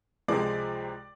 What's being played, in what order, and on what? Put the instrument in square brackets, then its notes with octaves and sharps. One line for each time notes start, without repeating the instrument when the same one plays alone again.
[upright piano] C#2 C3 F3 G#3 D5